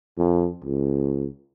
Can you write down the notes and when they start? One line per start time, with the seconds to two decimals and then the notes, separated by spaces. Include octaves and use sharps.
0.18 F2
0.64 C#2